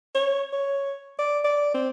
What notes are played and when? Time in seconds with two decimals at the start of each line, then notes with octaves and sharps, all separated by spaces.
0.15 C#5
0.53 C#5
1.19 D5
1.45 D5
1.75 C4